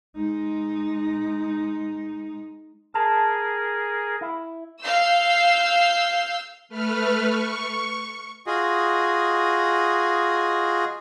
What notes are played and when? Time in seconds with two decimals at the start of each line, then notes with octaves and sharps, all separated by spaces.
0.16 G#3 D#4
2.94 G#4 A#4 A5
4.21 E4
4.82 F5 E6 G6 C7
6.69 A3 B4 F6
7.25 C#6
8.47 F4 F#4 G#4 D#5